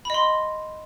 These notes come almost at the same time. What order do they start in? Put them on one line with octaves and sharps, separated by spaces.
B5 D#5 C6